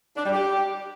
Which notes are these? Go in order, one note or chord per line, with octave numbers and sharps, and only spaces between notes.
D4
G3
G4